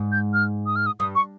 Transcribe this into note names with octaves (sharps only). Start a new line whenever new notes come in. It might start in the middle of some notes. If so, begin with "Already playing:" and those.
Already playing: G#2
G6
F6
D#6
F6
D#6
G2 D#6
C#6